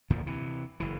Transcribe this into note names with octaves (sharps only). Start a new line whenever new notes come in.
D2 A#2 D3 F3
C3 E3
F#1 E3